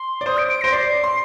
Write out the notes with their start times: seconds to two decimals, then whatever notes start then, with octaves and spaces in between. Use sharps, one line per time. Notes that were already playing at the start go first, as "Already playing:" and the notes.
Already playing: C6
0.21 D5
0.26 C5 D#6
0.38 D7
0.49 D7
0.61 C5 A#6
0.73 D5 C7
1.04 C6